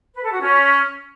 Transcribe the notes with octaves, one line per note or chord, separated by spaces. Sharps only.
B4
A4
F#4
C#4